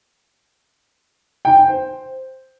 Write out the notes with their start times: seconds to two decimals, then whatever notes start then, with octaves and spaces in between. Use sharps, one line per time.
1.45 G5
1.56 G5
1.68 C5